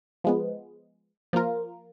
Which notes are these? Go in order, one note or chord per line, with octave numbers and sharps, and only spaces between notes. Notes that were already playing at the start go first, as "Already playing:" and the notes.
F3 G#3 B3
F3 A#3 F4 A#4